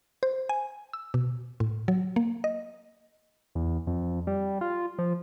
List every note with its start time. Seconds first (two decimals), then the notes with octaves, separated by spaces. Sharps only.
0.23 C5
0.49 G#5
0.93 E6
1.14 B2
1.60 A2
1.88 F#3
2.16 A#3
2.44 D#5
3.55 E2
3.87 F2
4.27 G3
4.61 F4
4.99 F3